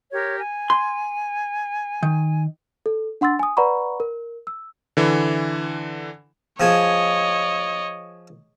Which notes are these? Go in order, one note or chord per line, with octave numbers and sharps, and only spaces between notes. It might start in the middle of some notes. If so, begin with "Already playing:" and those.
G4 A#4 C#5
G#5
C6
D#3
A4
D4 F#5 C6 E6 A6
G#5 D#6
B4 D5 F#5 A#5 B5 C#6
A#4
E6
D3 E3
F3 G#4 C#5 D#5